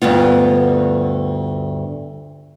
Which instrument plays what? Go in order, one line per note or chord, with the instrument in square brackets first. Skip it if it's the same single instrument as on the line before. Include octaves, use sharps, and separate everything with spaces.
[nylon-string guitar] D2 G2 B3 F4